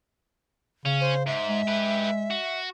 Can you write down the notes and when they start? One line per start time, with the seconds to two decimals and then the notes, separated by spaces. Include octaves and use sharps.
0.86 C#3 C#4
1.01 C5
1.27 G#2 E5
1.49 G#3
1.68 G4 B4
2.31 F#4